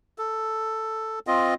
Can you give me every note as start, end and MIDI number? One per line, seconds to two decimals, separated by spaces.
0.18 1.19 69
1.27 1.54 60
1.27 1.54 65
1.27 1.54 75